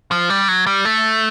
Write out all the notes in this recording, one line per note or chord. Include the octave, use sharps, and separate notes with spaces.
F3
G3
F#3
G3
A3